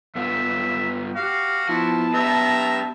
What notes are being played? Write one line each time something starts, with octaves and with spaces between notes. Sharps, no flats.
G2 B3 F4 E5
F#4 G4 F5
F3 B3 E4 A5
G4 B4 E5 A#5